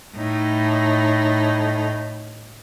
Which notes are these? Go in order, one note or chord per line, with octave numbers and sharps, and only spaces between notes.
A2 D#4